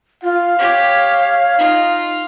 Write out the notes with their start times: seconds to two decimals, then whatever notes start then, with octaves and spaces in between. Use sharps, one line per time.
0.23 F4 F5
0.59 G4 C#5
1.58 D#4 F4